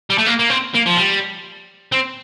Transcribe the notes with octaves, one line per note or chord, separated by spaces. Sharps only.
G3
A3
A#3
A#3
C4
A#3
F3
G3
C4